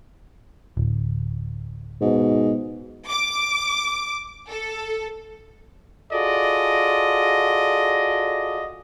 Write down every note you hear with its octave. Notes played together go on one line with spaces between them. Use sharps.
D1
G#2 B2
D6
A4
F4 F#4 G#4 A4 D5 D#5